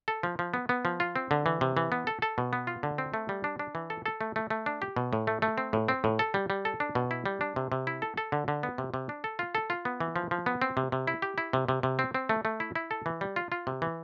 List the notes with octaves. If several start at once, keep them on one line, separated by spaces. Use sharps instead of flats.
A4
F3
F3
B3
B3
F3
F4
C4
D3
E3
C3
E3
B3
A4
A4
B2
B3
F4
D3
C4
A3
G3
D4
D4
E3
A4
A4
A3
A3
A3
D4
G4
B2
A2
A3
A3
C4
A2
C4
A2
A4
G3
G3
A4
D4
B2
E4
G3
D4
C3
C3
E4
A4
A4
D3
D3
B3
C3
C3
D4
A4
F4
A4
F4
B3
E3
F3
F3
B3
C4
C3
C3
E4
G4
E4
C3
C3
C3
C4
C4
A3
A3
E4
E4
A4
E3
G3
F4
F4
C3
E3